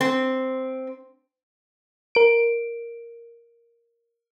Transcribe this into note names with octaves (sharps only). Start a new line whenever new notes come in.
C4
A#4 D7